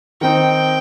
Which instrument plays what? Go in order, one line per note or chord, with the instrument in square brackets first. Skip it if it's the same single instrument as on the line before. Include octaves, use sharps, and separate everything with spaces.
[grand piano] D#3 C4 D#4 [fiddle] G5